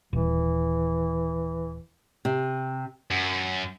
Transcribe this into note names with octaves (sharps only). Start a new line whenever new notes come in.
D#1 E3
C3
F#2